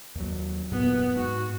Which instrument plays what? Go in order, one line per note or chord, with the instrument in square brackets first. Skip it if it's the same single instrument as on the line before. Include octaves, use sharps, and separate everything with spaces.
[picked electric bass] D#2 F#3
[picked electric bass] D#1 F#2 A#2 [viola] B3
[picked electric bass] G#2 [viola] F#4